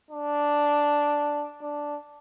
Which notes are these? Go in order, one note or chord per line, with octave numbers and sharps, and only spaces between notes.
D4
D4